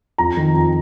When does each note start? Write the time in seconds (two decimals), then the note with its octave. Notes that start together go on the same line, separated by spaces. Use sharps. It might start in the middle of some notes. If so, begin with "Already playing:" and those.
0.18 F2 A#5
0.37 D#3
0.55 F2